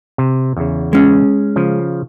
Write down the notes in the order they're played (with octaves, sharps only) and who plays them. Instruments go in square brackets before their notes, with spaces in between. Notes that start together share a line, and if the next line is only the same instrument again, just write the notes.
[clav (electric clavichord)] C3
E2 C#3
[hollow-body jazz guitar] G#3 C#4
[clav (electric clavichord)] C#3 F3